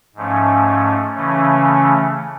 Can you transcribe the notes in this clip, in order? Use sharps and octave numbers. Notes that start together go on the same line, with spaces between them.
G#2 F3 A3 C#4
C#3 E3 A3 C#4